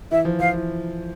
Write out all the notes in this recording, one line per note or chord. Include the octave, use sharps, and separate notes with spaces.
E3 E5
F3
F3 F5
E3